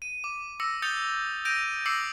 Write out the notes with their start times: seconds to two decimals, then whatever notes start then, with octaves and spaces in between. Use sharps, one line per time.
0.02 D#7
0.24 D6
0.60 D6 E6 A#6 C#7
0.82 D#6 G6 A6 C#7 F7 G7
1.45 G6 A#6 D7 D#7 F7
1.86 D6 E6 A#6 C7 C#7 F#7